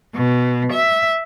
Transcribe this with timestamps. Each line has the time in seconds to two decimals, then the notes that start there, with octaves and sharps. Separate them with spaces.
0.16 B2
0.72 E5